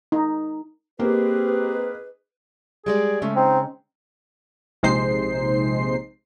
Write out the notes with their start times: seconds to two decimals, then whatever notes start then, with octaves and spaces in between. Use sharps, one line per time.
0.12 D#4
0.99 A#3 C4 D#4 G4 G#4 B4
2.86 G3 G#3 G#4 D5
3.22 C#3 G#3 A3 C#4
3.36 C4 D#4
4.83 A#1 C3 G#3 D#4 C5 C7